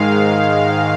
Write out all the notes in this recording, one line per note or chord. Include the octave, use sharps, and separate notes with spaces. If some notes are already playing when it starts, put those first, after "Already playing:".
Already playing: G#2 D#3 G#3 F5